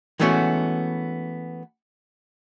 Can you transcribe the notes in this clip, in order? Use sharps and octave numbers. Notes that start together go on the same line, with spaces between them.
E3 G#3 A3 B3 C#4 F#4